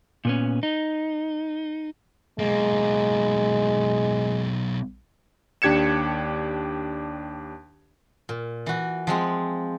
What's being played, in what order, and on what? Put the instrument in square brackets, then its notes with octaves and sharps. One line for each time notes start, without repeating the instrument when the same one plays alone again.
[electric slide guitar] A#2 B3 C#4
D#4
[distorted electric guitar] B1 A#3 [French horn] G#3
[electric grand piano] D#2 D4 G4 G#6 C#7 E7
[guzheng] A#2
E3 F#4
F3 G#3 C4